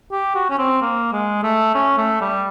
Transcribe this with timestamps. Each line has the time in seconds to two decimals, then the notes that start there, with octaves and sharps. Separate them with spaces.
0.12 G4
0.35 F#4
0.50 C#4
0.58 C4
0.82 A#3
1.13 G#3
1.43 A3
1.75 C#4
1.98 A3
2.21 G3